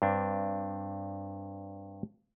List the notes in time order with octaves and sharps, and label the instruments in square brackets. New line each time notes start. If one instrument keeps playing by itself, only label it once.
[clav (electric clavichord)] G2 C4 D4